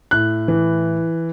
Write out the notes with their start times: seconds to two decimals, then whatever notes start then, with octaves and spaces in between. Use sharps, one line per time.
0.11 A2 F#6
0.48 E3